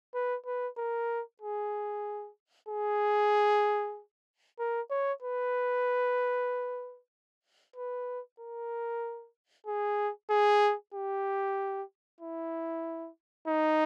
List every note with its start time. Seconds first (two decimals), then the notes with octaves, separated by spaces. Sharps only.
0.14 B4
0.47 B4
0.78 A#4
1.41 G#4
2.69 G#4
4.59 A#4
4.91 C#5
5.22 B4
7.76 B4
8.40 A#4
9.67 G#4
10.30 G#4
10.94 G4
12.21 E4
13.48 D#4